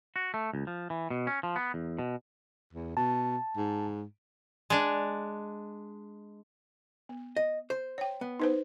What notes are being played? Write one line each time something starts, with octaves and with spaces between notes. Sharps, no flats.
F#4
A3
C#2
F3
E3
B2
C#4
F3
B3
E2
B2
E2
B2 A5
G#2
G#3 D4
B3
D#5
C5
C#5 G5
B3
D#4 B4 C5